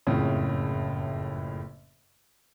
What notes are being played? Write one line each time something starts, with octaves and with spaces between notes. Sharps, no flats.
F#1 F2 A2 C#3